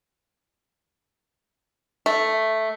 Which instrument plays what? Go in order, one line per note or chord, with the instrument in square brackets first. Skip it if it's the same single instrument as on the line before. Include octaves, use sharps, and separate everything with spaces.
[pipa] A3